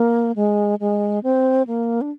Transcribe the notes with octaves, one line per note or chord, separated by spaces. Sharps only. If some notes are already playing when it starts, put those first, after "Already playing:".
Already playing: A#3
G#3
G#3
C4
A#3
D4